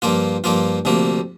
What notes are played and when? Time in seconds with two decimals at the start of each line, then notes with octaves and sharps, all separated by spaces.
0.02 G2 F3 A#3 F4
0.44 G2 F3 A#3 F4
0.85 D2 C3 F3 A#3